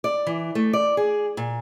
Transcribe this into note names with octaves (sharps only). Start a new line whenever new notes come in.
D5
E3
A3
D5
G#4
A#2